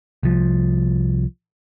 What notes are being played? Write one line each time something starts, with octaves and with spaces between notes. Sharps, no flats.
C2 F3